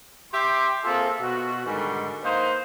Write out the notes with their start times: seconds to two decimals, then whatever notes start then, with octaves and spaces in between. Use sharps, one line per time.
0.33 G4 E5 G5 C6
0.84 A#3 C4 F4 G#4 A4 E5
1.21 B2 F#4
1.64 G#2 D3 D#3 G3 G#3 F#4
2.23 A#3 D#4 B4 C5